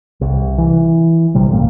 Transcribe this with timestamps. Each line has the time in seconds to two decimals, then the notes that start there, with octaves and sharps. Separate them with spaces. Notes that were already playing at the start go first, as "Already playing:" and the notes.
0.21 C2
0.58 E3
1.35 A#1 C3 G3
1.49 A1 G2 A#3